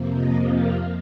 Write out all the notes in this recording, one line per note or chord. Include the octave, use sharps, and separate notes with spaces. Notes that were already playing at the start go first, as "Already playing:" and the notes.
Already playing: F2 C3 F3 A#3
D#5
F5